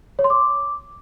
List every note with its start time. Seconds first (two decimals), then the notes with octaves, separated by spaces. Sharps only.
0.19 C#5
0.24 C6
0.30 D6